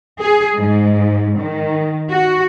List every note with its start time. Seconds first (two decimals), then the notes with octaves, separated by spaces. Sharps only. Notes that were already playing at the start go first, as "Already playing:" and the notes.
0.20 G#4
0.58 G#2
1.41 D#3
2.11 F#4